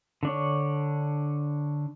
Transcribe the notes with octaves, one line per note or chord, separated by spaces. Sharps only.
D3 D4 C#5